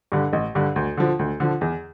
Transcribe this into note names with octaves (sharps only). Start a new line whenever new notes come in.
G2 D3
A1
G2 D3
D2
D3 F3
D2
D3 F3
E2